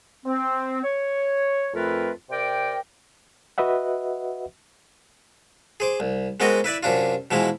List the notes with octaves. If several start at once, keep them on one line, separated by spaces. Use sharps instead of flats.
C4
C#5
F2 A3 C4 F4 A#4 B4
C3 A#4 D5 G5
F#4 B4 D#5 E5 F#5
G#4 C5 D6
C2
G#3 B3 C4 F#4 A#4 D#5
E4 B4 D5 E5
F#2 C3 D4 F4
B2 E3 F3 G#3 E4